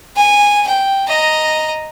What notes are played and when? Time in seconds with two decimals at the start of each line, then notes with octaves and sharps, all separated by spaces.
0.16 G#5
0.67 G5
1.08 D#5 A#5